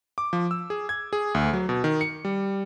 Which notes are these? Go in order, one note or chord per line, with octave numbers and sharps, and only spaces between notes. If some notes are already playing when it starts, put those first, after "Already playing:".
D6
F3
E6
G#4
G#6
G#4
D2
F#3
B2
D#3
C#7
G3